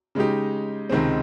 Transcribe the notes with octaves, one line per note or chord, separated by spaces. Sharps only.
C#3 G#3 D#4 G4
C#2 C3 D#3 G#3 C4